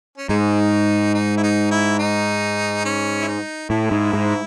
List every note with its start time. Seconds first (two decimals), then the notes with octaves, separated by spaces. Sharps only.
0.17 C#4
0.29 G#2 G#3 D#4
1.14 D#4
1.37 E4
1.43 G#3 D#4
1.71 E4
1.99 D#4
2.85 C#4
3.22 E4
3.28 D#4
3.70 A2 E4
3.91 G#2
4.13 G#2